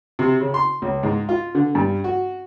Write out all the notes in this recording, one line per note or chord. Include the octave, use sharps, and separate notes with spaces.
C3
C#3
C6
C#2
G#2
F4
D3
G2
F#4